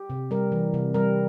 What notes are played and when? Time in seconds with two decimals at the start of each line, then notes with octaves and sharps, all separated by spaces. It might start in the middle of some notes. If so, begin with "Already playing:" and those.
Already playing: G4
0.10 C3
0.31 G3 A#4
0.52 E3
0.74 C3
0.94 G3 A#4